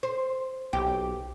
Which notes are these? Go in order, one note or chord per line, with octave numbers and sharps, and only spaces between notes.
C5
B1 G4